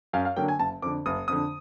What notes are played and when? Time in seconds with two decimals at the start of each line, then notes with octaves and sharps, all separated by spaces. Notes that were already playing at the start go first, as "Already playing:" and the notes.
0.13 F#2 F5
0.25 F5
0.36 D3 F#3 A#3 G5
0.48 G#5
0.59 F#1 A5
0.82 F2 D3 D6
1.06 F#1 D#6
1.28 F2 D3 D#6